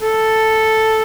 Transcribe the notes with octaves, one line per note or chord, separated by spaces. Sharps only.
A4